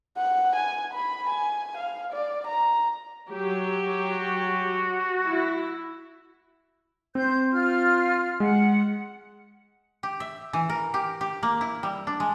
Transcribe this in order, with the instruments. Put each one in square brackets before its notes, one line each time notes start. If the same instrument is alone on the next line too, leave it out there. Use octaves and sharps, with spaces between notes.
[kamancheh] F#5
G#5
B5
G#5
F5
D5
A#5
[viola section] F#3 G4
[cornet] F#4
[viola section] E4
[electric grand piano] C4 [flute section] C5 G6
[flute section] F4 F6
[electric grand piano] G#3 [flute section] F#5
[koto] G4
E5
E3
A#4
G4
G4
A#3
E4
G3
D4
G#3